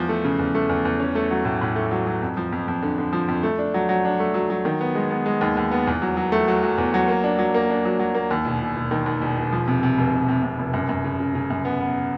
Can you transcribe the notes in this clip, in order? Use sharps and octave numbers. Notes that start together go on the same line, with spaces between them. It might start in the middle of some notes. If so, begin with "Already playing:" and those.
Already playing: E2 F3
A3
C#3
E2
A3
E2
E2
C#4
A3
F#3
A2
A2
A3
F#3
F#3
F2
F3
F2
F2
D3
D3
F3
F2
A3
D4
F#3
F#3
D4
A3
F#3
F#3
D#3
B3
G#3
B3
G#3
D#2
D#2
B3
E2
F#3
F#3
A3
F#3
F#3
E2
F#3
A#3
D4
F#3
A#3
D4
F#3
F#3
A#3
D#2
E1
E1
E1
D#3
D#2
E1
E1
F3
C3
C3
F1
F1
C3
C3
F1
F#2
F#2
C#3
C#3
C#3
F#2
B3
B3